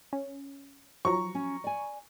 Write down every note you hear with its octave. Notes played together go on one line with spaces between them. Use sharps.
C#4
F3 F#3 A#5 C#6
C#4
D5 G#5